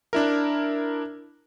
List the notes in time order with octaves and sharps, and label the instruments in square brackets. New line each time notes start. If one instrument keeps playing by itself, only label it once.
[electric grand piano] D4 E4 A#4